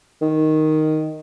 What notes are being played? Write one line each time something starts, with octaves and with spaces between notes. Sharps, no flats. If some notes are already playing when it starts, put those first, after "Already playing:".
D#3